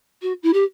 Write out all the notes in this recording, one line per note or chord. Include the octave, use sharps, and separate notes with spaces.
F#4
E4
G4